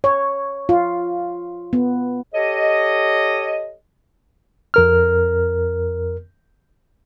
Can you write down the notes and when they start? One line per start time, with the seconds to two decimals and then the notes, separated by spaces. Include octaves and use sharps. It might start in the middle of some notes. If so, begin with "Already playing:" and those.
0.04 C#5
0.69 F4
1.73 B3
2.34 G4 A4 C#5 D#5
4.74 F2 A#4 F6